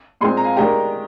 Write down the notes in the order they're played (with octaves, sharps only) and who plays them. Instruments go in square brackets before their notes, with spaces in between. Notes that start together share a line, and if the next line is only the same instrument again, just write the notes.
[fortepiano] A#2 G#3 C4 [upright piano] G#5 C6
[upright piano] A#5
F5 G#5
[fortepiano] D#3 G#3 D4 G4 [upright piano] G5 A#5